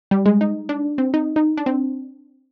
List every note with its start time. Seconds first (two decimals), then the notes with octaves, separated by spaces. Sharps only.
0.11 G3
0.26 G#3
0.41 D#4
0.69 D4
0.98 C4
1.14 D#4
1.36 D#4
1.57 D4
1.66 C4